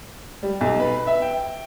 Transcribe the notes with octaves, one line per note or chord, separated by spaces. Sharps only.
G3
B1
B4
E5
G5